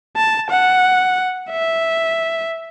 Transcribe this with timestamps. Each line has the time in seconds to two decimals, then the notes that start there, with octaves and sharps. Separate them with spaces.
0.16 A5
0.50 F#5
1.51 E5